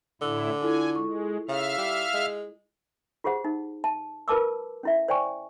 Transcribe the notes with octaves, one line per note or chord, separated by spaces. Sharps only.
A2 D3 E4 E6
E4 F4 A4 G#5
G#3 C#6
C#3 E5 F5 F6
G3
G#3
F4 G4 G#4 C5 F#5
D#4
A5
F4 A#4 B4 A5 D6 E6
C#4 E4 E5
C5 D5 G5 G#5 C#6